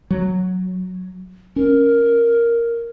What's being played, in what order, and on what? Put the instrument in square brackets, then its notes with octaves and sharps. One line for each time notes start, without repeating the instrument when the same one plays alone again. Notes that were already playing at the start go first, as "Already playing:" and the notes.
[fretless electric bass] F#3
[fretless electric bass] C#4 [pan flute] A#4